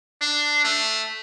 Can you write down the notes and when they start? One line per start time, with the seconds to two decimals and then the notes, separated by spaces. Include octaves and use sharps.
0.21 D4
0.64 A3